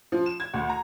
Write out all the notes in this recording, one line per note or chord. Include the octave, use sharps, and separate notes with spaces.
F3
E7
G#6
D2
A#5